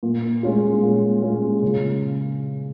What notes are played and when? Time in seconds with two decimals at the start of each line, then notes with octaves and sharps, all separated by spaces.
0.03 A#2
0.43 G#3 C#4 F4
0.82 A#2
1.22 G#3 C#4 F4
1.62 C#3